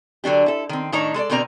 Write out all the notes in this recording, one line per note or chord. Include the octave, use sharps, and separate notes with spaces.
D3 F#3 D4 G4
E4 A4
D#3 C4
A2 D#3 D4 D#4 C#5 A#5
G#3 A4 C#5 D5
B2 D3 C4 A#4 D5 A#5